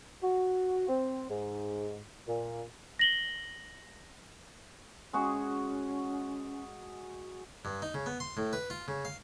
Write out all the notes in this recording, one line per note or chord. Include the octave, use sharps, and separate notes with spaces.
F#4
C4
G#2
A#2
A#6 F#7 G7
G#3 C#4 F#4 G#4
G2
D#4
C#3
B3
C6
A2
B4
F4
C#3
F5